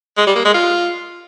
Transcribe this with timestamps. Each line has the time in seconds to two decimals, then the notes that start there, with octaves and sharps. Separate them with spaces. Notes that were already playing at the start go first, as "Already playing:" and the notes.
0.18 G#3
0.27 G3
0.36 A#3
0.45 G#3
0.54 F4